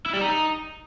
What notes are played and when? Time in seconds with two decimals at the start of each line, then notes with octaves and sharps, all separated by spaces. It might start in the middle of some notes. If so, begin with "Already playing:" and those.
0.06 E4
0.14 G3
0.21 D#4